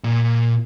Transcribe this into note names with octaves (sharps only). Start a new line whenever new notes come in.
A#2